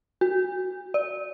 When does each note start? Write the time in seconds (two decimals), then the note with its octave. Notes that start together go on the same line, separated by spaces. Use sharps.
0.21 F#4
0.94 D5